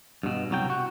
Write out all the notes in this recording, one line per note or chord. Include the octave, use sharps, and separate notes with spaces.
G2 B2
C2 F#3 G5
F#4